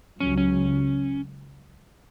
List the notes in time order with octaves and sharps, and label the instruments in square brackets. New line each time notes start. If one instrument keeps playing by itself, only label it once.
[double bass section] C#2 C#3 F#3 [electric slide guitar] C#4
[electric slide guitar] C#4